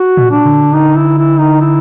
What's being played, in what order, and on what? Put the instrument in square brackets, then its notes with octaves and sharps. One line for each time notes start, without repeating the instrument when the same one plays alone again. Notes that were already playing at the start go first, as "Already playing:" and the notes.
Already playing: [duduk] F#4
[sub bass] A#2
[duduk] D4
[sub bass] D3
[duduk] D#4
E4
E4
D#4
E4